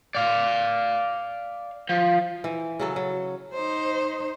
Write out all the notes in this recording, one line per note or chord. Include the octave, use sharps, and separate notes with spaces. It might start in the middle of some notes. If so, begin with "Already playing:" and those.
D5 F5
F3
E3
C#3 F#3 A4
F#3
D#4 C5